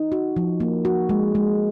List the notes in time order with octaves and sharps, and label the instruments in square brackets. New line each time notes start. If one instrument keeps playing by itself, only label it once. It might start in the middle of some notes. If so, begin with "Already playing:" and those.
Already playing: [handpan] D#4
F#4
F3
A#3
F#4
G#3
G#3